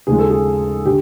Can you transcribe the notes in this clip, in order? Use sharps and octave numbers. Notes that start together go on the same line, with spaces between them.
D#2 C#3 F3 G#3 G#4
A4
G#4
D3 G4